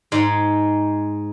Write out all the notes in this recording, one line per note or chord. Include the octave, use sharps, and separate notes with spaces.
G#2 G#3